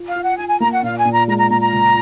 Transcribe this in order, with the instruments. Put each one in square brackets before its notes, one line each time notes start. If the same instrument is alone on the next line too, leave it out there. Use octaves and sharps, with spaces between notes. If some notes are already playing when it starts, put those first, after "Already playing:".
Already playing: [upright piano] F4
[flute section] F5
[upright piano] F4
[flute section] F#5
[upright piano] F4 [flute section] G#5
[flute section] G#5
[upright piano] A#3 [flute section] A#5
[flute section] F#5
[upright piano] A#2 [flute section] F5
[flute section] G#5
[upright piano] A#2
[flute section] A#5
[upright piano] G#3 [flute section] A#5
[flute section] A#5
[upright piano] A#2 [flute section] A#5
[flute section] A#5
[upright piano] C#2